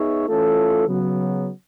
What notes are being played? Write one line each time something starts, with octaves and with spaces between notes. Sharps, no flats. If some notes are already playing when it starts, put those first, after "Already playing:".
Already playing: B3 D#4 G#4 C#5 E5
E3 A3 C#4 F4 A4
C#3 F#3 B3